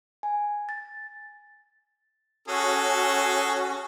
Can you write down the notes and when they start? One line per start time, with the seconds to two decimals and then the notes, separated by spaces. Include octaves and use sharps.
0.23 G#5
0.69 A6
2.48 C#4 F#4 G#4 A4